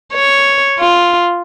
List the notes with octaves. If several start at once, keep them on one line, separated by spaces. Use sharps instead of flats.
C#5
F4